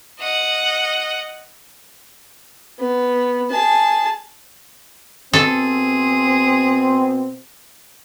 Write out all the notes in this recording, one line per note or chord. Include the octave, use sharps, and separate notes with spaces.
D#5 F#5
B3
G#4 A5
B2 C4 G#4 A4